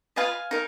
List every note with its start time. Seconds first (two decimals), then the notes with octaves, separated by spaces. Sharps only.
0.16 F4 B4 D#5 F5 G#5
0.51 D#4 A#4